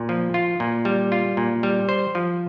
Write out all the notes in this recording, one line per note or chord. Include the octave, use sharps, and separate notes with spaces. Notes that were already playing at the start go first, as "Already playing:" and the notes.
Already playing: A#2
F3
F4
A#2
G3
F4
A#2
G3
C5
F3